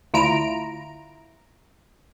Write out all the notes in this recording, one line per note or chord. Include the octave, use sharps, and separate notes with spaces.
D2 E4 F4 A#5 D7